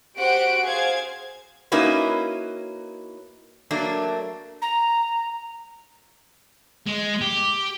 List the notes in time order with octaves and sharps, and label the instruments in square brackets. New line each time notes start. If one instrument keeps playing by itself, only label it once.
[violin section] F#4 G4 C5 F#5 D7
G#4 C5 F5 G#6
[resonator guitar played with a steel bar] A#3 C#4 D#4 E4 F#4 B4
F#3 A3 A#3 D4
[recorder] A#5
[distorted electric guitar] G#3
G4